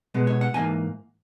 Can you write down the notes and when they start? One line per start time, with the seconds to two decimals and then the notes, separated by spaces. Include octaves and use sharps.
0.14 B2 G#3 B3
0.27 C#5
0.41 F#5
0.54 G#2 E3 A#3 G#5